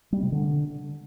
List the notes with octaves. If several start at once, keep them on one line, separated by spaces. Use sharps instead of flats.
G3
C3
D3